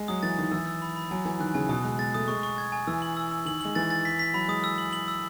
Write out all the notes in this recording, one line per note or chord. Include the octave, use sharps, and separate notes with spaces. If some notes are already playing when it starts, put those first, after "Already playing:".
Already playing: G#3
F#3 D#6
E3 A6
D#3 D#6
E3 E6
E6
B5
B5
F#3 G#5
E3 G#5
D#3 F#6
C#3 G#5
B2 D#6
G#3 D#6
G#3 A6
A3 D#6
G#3 C#6
C#6
G#6
G#5
E3 E6
F#7
E6
E6
D#3 F#7
G#3 F#7
E3 A6
A6
B6
B6
F#3 B5
G#3 D#6
E6
F#7
F#7
E6